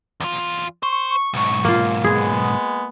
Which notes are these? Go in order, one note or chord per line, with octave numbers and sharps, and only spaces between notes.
E2 F4
C5 C#6
B1 G#2
A#3 F4
G#3 B3 G#4